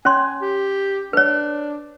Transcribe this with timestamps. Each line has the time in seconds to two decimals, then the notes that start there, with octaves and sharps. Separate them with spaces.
0.05 C#4 C#5 G#5 C6
0.41 G4
1.13 D4 B4 C#5